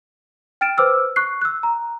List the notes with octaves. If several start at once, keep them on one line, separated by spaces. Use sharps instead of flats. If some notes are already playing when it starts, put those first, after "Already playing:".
G5 F6 A6 D7 E7
B4 C5 D6 E6 F6
C#6 F#6 C7
E6 F#6
A#5